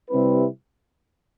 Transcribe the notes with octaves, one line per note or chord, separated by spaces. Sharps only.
C3 G3 C4 E4 B4